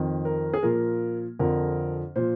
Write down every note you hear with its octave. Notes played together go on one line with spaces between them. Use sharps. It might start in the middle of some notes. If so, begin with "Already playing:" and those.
Already playing: F2 D#3
A#4
G#4
A#2 F3 A#4
F2 D3 F3 A#4
A#2 F3 C5